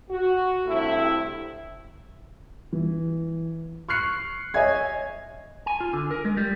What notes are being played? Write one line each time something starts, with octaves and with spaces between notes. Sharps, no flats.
F#4
G2 C3 A3 E4
E3
C#6 F6 F#6 C7 C#7
C#5 D#5 E5 G#5 G#6
G#5
F4
D3
A#4
G#3
G3